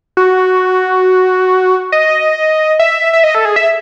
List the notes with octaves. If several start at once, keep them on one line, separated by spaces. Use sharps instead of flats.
F#4
D#5
E5
E5
D#5
A4
G#4
E5